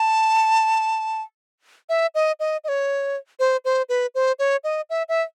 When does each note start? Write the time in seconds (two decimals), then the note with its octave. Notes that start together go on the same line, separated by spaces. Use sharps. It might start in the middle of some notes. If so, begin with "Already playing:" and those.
Already playing: A5
1.89 E5
2.15 D#5
2.40 D#5
2.64 D#5
2.68 C#5
3.39 C5
3.65 C5
3.89 B4
4.15 C5
4.39 C#5
4.64 D#5
4.90 E5
5.09 E5